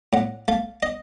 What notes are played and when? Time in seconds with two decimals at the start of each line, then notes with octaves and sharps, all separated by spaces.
0.13 A2 F#5
0.48 A3 F5
0.83 D#5